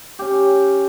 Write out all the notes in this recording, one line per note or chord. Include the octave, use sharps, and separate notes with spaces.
C#4 G4